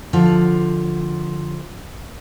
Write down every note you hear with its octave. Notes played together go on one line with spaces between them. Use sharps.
D3 F3